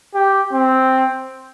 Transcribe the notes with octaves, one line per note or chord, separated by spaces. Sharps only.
G4
C4